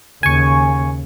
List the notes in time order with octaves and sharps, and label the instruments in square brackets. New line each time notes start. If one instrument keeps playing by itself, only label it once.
[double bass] D#2 C#3 [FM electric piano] G#5 C#6